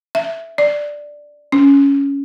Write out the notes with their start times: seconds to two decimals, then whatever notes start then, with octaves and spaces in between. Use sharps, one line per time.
0.15 E5
0.58 D5
1.52 C#4